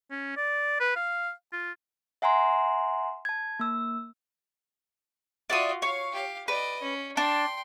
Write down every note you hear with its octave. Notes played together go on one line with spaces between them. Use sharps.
C#4
D5
B4
F5
F4
E5 F#5 G#5 A#5 C6
A5 G#6
A#3 E6
F4 F#4 D5 E5 D#6
C#5 F5
G4 F5
B4 D5 D#5
C#4
D4 G5 C6